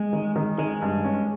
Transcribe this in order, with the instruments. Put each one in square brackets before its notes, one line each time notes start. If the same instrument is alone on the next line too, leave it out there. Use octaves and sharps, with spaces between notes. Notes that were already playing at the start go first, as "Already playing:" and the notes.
Already playing: [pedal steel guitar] G#3
[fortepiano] D#3
D#3
[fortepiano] D#3 [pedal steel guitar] G#3
[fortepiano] G2
C#4